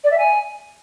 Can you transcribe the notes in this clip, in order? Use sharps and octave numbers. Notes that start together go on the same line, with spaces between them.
D5
E5
G#5